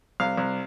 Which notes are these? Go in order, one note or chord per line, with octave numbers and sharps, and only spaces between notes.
C2 F5
C2